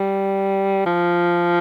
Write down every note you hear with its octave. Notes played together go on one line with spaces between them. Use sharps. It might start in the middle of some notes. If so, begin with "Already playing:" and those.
Already playing: G3
F3